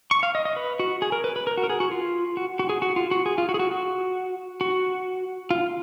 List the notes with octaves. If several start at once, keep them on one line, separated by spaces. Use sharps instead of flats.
C#6
F5
D#5
D#5
B4
F#4
G#4
A#4
B4
B4
A#4
F#4
A#4
G#4
F#4
F4
F#4
F#4
G#4
F#4
F4
F#4
G#4
F4
F#4
G#4
F#4
F#4
F#4
F4